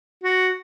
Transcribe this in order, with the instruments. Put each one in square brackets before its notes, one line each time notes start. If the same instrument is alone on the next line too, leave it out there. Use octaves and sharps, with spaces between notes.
[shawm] F#4